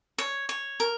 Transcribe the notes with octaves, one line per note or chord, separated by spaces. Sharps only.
C#5
C#5
A#4